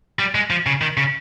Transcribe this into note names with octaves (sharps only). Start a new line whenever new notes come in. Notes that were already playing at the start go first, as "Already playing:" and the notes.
G3
G#3
F3
C#3
D#3
C#3